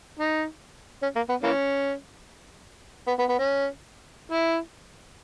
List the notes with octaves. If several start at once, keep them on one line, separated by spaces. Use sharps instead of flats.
D#4
C#4
A#3
B3
E3 A#3 C#4
B3
B3
B3
C#4
E4